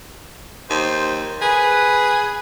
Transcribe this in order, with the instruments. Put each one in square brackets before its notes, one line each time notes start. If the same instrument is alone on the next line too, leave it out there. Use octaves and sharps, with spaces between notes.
[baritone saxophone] D#2 [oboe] C5
[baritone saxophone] G#4 [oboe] B4